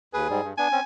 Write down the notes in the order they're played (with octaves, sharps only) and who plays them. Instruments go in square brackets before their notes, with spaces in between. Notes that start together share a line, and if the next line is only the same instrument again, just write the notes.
[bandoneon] D#2 B4 [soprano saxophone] G#4
[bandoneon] G#2 G3
G2
[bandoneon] B3 D4 [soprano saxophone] G#5
[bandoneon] C4 C#4